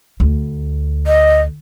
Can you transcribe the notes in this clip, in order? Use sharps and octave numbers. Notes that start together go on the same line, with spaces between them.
D2
D#5